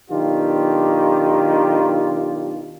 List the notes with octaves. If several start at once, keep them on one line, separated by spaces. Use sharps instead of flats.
B1 D#3 D4 F4 G4